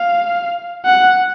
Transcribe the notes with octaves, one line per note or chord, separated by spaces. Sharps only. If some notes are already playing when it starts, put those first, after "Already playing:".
Already playing: F5
F#5